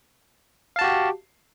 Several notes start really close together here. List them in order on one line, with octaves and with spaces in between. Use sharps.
F5 A5 F#4 G4